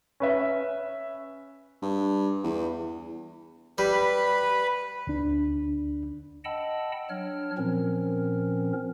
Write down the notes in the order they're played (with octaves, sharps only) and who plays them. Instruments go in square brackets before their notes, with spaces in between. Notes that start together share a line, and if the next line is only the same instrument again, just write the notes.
[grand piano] C#4 B4 E5
[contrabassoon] G2
E2
[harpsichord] G3 [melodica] B4 B5
[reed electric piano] D2 D4
[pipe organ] D#5 F#5 G5 A5 B5 E6
F#3 D4 C#5 F6
A#2 F3 C4 C#4 A#4